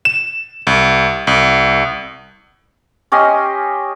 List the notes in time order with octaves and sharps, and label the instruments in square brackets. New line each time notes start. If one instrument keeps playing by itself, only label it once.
[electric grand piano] E7
C2
C2
[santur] C#4 G4 D#5 C6